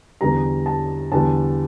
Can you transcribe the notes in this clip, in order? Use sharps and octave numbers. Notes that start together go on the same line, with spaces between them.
E2 D3 G3 A#5
A5
E2 D3 G3 A5